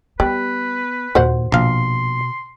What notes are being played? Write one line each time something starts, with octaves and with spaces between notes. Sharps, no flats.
G3 B3 B4
D#2 A#2 F#4 C5 F#5
A#1 B2 F5 C6